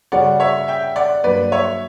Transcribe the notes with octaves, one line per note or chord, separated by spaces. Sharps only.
C#3 G3 C#4 F#4 D5 F#5
C#5 E5
E5 G5
D5 F#5
G2 F#3 A#3 B4 D5
C#5 E5